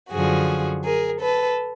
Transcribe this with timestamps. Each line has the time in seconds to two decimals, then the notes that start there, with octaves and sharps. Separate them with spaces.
0.11 F#2 D3 F3 F#4 G#4
0.84 G#4 A#4
1.21 A4 B4